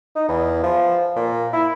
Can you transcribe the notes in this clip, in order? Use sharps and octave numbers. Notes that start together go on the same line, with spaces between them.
D#4
E2
F3
A#2
E4